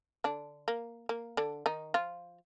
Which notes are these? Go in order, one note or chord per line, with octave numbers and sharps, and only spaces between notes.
D3 D4
A#3
A#3
D3 D4
D#3 D#4
F3 F4